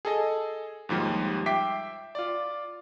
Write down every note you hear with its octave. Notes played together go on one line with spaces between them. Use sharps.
G#4 A4 D#5
D#2 G#2 F3 G3
E5 G5 D6 B6 C7
F4 D5